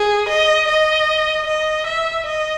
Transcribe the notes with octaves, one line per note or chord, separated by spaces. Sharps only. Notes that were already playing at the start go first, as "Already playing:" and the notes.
Already playing: G#4
D#5
D#5
D#5
E5
D#5